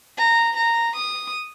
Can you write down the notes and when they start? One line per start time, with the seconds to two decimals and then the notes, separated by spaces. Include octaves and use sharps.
0.18 A#5
0.57 A#5
0.96 D#6